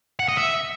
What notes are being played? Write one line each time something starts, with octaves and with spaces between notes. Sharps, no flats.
F#5
D#5
E5